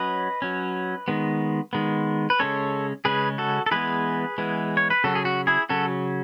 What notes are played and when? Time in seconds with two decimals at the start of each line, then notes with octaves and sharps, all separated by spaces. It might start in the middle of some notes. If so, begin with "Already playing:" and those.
Already playing: F#3 C#4 B4 D#5
0.42 F#3 C#4
1.08 D#3 G#3 B3
1.73 D#3 G#3 B3
2.30 B4
2.40 C#3 G#3 C#4 A4 C#5
3.05 C#3 G#3 C#4 G#4 B4
3.38 F#4 A4
3.66 A4
3.71 E3 G#3 B3 G#4 B4
4.38 E3 G#3 B3
4.77 C#5
4.90 B4
5.04 C#3 F#3 C#4 F#4 A4
5.15 G#4
5.25 F#4
5.47 E4 G#4
5.69 C#3 F#3 C#4 F#4 A4